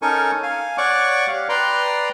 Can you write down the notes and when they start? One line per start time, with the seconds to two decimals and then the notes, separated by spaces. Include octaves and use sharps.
0.02 C#4 D#4 A4 A#4 G#5 C#6
0.43 F5 G#5
0.78 C#5 D5 F#5 C#6 D6
1.27 G4 F5
1.49 B4 D5 G5 A#5 C6